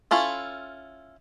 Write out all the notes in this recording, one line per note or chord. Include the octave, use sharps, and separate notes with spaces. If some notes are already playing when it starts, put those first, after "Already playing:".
C#4 E4 F4 A4